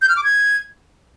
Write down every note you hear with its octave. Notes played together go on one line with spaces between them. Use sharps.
G6
F6
D6
G#6